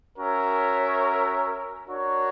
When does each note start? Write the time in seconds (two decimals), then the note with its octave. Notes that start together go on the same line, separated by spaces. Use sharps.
0.18 C#4 F#4 A#4 C#5 E5
1.86 D4 F#4 A#4 C#5